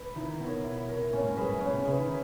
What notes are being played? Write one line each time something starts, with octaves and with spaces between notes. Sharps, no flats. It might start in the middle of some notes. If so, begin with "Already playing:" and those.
Already playing: B4
D#3 E4
B2 A#4 C#5
E4
A#4 C#5
A#2 C#4
G#2
F#2 G#4 B4 E5
G#2
A#2 C#4
B2
C#3 G#4 B4 E5
D#3